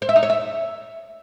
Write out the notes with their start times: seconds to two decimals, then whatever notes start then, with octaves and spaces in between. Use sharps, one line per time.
0.02 C5
0.09 E5
0.16 D#4
0.23 C#5
0.30 E5